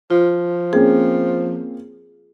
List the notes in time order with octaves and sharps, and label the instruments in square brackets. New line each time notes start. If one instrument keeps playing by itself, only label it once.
[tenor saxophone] F3 [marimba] F4
[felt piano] A#3 C4 C#4 [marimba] G#4